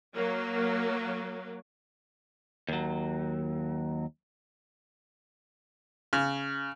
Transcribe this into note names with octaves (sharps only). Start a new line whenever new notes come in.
F#3 A#3
D#2 F#3
C#3